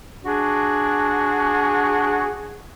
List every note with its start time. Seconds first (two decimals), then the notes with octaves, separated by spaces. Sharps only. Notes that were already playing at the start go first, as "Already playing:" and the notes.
0.24 D4 F#4 G#4